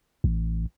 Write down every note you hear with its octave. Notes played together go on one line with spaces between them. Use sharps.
A1